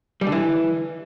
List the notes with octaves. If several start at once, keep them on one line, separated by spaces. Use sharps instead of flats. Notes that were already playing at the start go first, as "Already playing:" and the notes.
G3
D3
E3